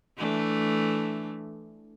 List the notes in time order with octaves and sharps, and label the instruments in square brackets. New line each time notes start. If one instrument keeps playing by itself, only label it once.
[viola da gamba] E3 A3 D4